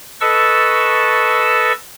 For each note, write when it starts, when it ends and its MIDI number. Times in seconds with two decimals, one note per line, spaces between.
0.21 1.72 69
0.21 1.72 71
0.21 1.72 75
0.21 1.72 81
0.21 1.72 85
0.21 1.72 88